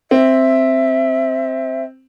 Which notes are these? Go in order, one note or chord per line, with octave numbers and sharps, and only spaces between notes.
C4 E5